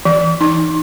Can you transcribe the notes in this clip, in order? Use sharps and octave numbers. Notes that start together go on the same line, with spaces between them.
E3
D#4